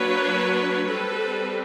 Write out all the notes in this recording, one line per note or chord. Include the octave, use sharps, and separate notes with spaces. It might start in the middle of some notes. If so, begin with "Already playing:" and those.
Already playing: F#3 A#3 D4 B4 C#5
G3 C4 A4 B4